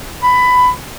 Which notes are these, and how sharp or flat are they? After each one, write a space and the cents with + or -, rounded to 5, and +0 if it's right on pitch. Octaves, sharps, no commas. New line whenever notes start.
B5 +15